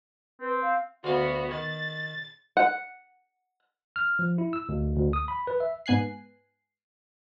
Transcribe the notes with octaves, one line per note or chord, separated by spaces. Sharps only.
C4 B4
F5
D2 B3 F#4 F5
D#3 A6
F#5
F6
F3
E4
E6
D2
D2
D#6
B5
B4
E5
G#2 B3 G#5 F#6 C7